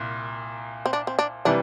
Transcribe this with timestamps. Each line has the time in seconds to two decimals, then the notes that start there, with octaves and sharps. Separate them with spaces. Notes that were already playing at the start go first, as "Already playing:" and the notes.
Already playing: C2 A#2
0.86 C4
0.93 D4
1.07 C4
1.19 D4
1.45 C3 E3 G3 D4